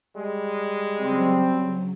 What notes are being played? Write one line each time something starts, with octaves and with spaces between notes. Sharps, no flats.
G3 G#3
C#3 F#3 C4